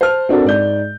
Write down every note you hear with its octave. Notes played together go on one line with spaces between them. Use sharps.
C5 A5 F6
C4 D4 F#4 A4 A#4
G#2 D5 G6